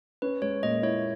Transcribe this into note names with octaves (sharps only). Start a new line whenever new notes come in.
C#4 B4
G#3 C#5
A#2 D#5
E4 C#5